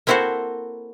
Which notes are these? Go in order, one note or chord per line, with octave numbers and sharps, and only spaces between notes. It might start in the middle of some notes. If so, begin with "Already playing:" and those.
A#3 C4 E4 F#4 A4 C5